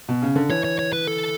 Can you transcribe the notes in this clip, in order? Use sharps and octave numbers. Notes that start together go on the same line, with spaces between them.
B2
C#3
D3
E3 C#5
C#5
C#5
B4
A4